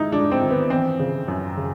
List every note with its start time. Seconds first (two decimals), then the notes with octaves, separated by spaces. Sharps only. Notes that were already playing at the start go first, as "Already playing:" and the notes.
Already playing: G#2 D#4 E4
0.12 G#2 D4
0.32 C4
0.41 D#3
0.51 B3
0.70 E3 C4
0.99 C#3
1.28 F#2
1.57 C#3